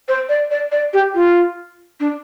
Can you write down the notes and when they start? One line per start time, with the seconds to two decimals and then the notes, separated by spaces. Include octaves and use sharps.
0.08 C5
0.29 D5
0.51 D5
0.72 D5
0.93 G4
1.15 F4
2.00 D4